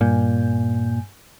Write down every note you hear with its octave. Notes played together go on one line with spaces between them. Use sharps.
G2 A#2 G#5 G6